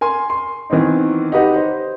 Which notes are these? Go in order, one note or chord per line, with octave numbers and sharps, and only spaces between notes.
A#4 G#5 C6
C6
D#3 E3 B3 C4 D#4
D#4 F#4 G4 B4 D#5 F#5
C5